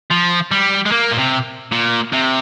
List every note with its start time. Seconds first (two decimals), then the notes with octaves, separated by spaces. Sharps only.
0.10 F3
0.51 G3
0.86 G#3
0.91 A#3
1.11 A#2
1.18 C3
1.72 A#2
2.12 C3